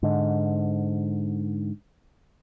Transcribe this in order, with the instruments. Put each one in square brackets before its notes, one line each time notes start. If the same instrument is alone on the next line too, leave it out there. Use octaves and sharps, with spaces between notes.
[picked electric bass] G#2 D3